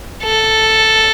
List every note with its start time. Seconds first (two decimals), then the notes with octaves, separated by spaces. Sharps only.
0.23 A4